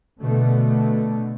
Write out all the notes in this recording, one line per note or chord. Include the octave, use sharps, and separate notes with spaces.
B2 D3 A3